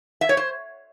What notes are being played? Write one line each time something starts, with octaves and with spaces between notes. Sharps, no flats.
E5
C#5
C5